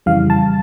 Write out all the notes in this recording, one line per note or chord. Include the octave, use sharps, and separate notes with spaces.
F2 C#3 E3 G3 F5
A5